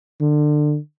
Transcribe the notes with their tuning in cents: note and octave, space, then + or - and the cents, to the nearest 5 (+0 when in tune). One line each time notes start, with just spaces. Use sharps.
D3 +25